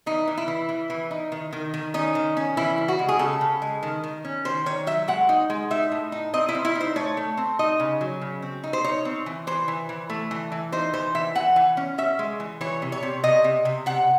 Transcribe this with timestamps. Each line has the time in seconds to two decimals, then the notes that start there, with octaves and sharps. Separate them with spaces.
0.06 E3 D#4
0.27 E3
0.37 E4
0.48 E3
0.69 E3
0.90 E3
1.11 D#4
1.32 D#3
1.53 D#3
1.74 D#3
1.94 C#4 D#4
2.15 D#3
2.37 C#4
2.57 E3 E4
2.78 C#3
2.88 F#4
2.99 G#3
3.09 G#4
3.19 C#3 A4
3.41 C#3
3.62 G#3
3.83 D#3
4.03 D#3
4.25 C#4
4.45 D#3 C5
4.66 D#3 C#5
4.87 F#3 E5
5.08 G#3 F#5
5.29 D#4
5.50 G#3
5.71 D#4 E5
5.92 A2
6.12 D#4
6.33 C4 D#5
6.49 E4
6.55 C4
6.65 E4
6.75 D#4
6.80 C5
6.96 A3 C#5
7.17 A3
7.37 C4
7.59 D#4 D#5
7.80 C#3
8.01 F#3
8.22 C#3
8.42 C4
8.63 D#4
8.73 C5
8.84 D#4 C#5
9.05 C4
9.26 E3
9.47 E3 C5
9.68 E3
9.89 E3
10.10 A3
10.31 E3
10.52 E3
10.72 D#4 C5
10.93 E3 C5
11.15 E3 E5
11.35 E3 F#5
11.56 E3
11.77 C#4
11.98 C#4 E5
12.19 G#3
12.40 E3
12.61 E3 C#5
12.82 C3
12.92 C#5
13.03 C3
13.24 C3 D#5
13.44 C3
13.65 C3
13.86 C3 F#5